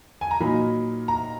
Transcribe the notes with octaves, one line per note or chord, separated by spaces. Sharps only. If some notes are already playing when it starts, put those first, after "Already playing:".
G#5
A#5
A#2 F#3 A#3 D#4 B5
A#5